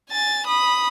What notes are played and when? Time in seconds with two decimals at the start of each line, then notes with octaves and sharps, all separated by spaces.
0.10 G#5 A6
0.46 B5 D#6